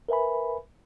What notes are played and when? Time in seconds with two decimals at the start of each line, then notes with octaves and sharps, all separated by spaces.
0.09 A#4 B4 E5 G#5 B5